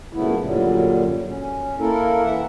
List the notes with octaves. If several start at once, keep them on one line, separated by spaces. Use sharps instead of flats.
F#2 A#2 C#3 A3 B3 E4
F#2 A#2 D3 F#3 G3
C#4
A#3 E4 A4 A#4
E3 E5 F#5